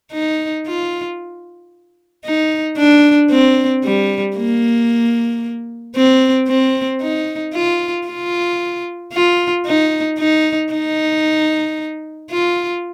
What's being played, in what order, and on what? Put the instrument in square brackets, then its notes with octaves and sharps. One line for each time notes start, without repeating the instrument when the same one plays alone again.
[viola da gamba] D#4
F4
D#4
D4
C4
G3
A#3
C4
C4
D#4
F4
F4
F4
D#4
D#4
D#4
F4